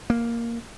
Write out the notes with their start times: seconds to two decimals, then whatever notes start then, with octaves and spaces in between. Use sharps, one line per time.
0.10 A#3